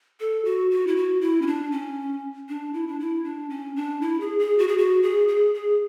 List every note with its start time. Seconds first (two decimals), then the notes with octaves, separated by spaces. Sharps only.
0.20 A4
0.45 F#4
0.71 F#4
0.87 E4
0.96 F#4
1.21 E4
1.42 C#4
1.47 D4
1.72 C#4
2.49 D4
2.73 E4
2.88 D4
3.00 E4
3.24 D4
3.50 C#4
3.76 D4
4.02 E4
4.20 G#4
4.39 G#4
4.58 F#4
4.68 G#4
4.78 F#4
5.03 G#4
5.28 G#4
5.54 G#4